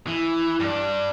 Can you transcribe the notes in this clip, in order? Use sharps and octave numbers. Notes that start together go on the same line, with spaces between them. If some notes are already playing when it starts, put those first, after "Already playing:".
E3
G2 D4